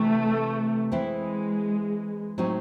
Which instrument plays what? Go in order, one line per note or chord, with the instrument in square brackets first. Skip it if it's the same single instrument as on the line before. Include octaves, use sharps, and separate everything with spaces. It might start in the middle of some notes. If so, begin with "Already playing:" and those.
Already playing: [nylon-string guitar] C3 E3 [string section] A3
[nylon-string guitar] E3 C4 E4 [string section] G#3
[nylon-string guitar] A2 F#3 C4 D#4